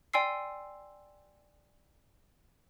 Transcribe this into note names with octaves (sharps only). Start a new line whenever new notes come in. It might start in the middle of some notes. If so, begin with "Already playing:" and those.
D5 G5 G#5 C6 E6 C7